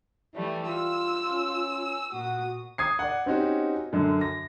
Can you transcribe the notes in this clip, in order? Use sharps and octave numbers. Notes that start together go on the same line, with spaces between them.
E3 G3 A3
F4 E6
C#4
A#2 F#4 D#6
D#6 G#6 C7
D5 F#5
C4 C#4 D#4 F#4 G4
F#2 D3
A#6